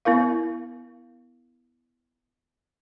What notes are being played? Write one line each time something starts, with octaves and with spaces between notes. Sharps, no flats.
B3 E4 A#4 F5